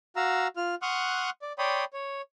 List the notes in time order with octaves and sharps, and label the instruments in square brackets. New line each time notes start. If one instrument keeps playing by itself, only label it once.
[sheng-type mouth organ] F#4 F5 A#5 E6
F4 F6
F#5 C6 C#6 D#6 F6 F#6
D5
C#5 D5 G5 B5 C6 D#6
C#5